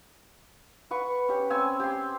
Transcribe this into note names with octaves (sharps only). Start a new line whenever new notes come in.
B4 F#5 C#6
C#4 G4
C4 C#4 G#5 E6
G4 C6